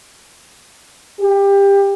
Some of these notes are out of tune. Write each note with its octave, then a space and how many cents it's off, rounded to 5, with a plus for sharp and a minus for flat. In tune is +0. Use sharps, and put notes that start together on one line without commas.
G4 +20